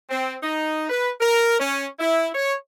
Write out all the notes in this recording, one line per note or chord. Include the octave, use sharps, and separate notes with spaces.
C4
D#4
B4
A#4
C#4
E4
C#5